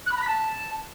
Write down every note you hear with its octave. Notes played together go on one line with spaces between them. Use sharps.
F#6
B5
A#5
B6
A5